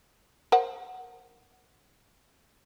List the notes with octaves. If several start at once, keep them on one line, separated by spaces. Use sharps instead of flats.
A#4 C5 F#5